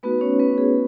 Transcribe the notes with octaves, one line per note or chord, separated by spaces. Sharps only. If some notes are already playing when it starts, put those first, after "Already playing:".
A3 B3 D#4 F#4 B4
C#4 C#5
B3 B4
G#4